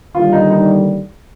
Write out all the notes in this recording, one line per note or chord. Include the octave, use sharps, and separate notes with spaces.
D#2 D3 G3 F4
D#4
D#4